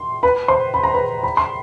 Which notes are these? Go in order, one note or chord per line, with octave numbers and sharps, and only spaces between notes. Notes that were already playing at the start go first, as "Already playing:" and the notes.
Already playing: C6
B4 B5
C5 C6
B5
A#5
B4 B5
B5
C6